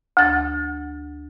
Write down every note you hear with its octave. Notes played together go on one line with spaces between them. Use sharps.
D2 A6